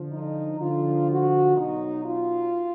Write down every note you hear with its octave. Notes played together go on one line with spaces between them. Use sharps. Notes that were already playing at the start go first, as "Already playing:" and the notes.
Already playing: D3 F3
D#4
D3 F3 F4
F#4
B2 F#3 D#4
F4